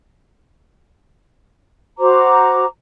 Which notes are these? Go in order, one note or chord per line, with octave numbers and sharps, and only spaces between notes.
F#4 C5 A#5 D6